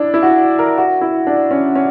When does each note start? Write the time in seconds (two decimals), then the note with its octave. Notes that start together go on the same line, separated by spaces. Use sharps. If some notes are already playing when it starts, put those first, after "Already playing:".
Already playing: D4 E4
0.14 E4
0.23 F#4
0.59 A#4
0.78 F#4
1.01 E4
1.27 D4
1.51 C#4
1.75 C#4